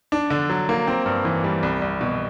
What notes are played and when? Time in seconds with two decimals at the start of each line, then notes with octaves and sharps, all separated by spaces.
0.12 D4
0.30 D3
0.50 F#3
0.69 A#3
0.87 C4
1.06 G2
1.25 E3
1.44 G3
1.63 C2
1.82 C2
2.01 B2